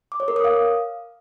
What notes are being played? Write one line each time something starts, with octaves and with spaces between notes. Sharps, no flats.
D6
C#5
A#4
D#6
F5